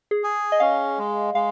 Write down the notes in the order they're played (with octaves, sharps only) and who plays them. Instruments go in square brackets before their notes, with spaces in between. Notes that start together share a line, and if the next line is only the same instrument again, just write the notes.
[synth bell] G#4
[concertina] G#4
[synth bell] D#5
[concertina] C#4 [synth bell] F5
[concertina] G#3
[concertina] G#3 [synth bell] F5